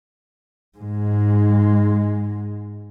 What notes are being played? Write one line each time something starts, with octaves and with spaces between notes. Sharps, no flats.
G#2 G#3